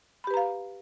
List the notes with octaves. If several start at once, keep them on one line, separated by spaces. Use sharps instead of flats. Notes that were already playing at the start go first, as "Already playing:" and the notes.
G4 B4 F5 A#5 B5